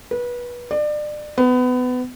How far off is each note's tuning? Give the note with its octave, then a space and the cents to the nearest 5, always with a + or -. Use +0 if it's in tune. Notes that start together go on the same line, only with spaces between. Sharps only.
B4 -25
D5 +30
B3 +25